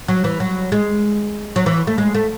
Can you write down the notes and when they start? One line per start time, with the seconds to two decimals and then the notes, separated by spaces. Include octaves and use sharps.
0.08 F#3
0.24 E3
0.40 F#3
0.72 G#3
1.56 F#3
1.66 E3
1.87 A3
1.98 G#3
2.15 A3